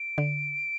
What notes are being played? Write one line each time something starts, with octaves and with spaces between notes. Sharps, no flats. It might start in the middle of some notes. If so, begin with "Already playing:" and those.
Already playing: D7
D3